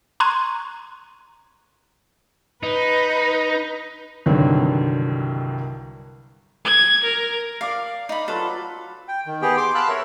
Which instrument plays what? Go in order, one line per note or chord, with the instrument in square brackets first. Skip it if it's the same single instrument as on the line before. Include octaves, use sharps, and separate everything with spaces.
[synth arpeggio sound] A#5 C6 C#6 F#6 G#6 D#7
[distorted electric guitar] D#4 [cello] B4
[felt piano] C2 G2 D3 D#3 F#3
[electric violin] G#6
A#4
[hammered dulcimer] A#4 D5 D6 [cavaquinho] F5
[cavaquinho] D#4 B5
[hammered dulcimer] F#3 F4 B4 [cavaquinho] A4
[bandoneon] G5
D#3
B3 G4 G#4 G5
C6 D6
F5 A5 B5 E6 F#6
A#4 C#5 E5